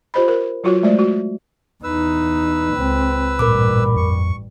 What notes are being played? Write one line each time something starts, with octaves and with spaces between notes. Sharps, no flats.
F4 G4 C5 D#5 B5
A#4
F#3 F4 F#4 C#5
G#3 A3 C5 D5 E5
F#4
E2 D#4 B4 E6
C#2 C4
A1 G2 A#2 A#4 B5 D6
F2 C#6